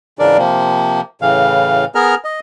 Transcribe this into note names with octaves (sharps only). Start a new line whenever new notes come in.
G#2 C#3 E3 D4 A#4 D5
C3 F3 A#3
A2 C#3 E3 F5
B3 G#4 A#4 A#5 F6
D#5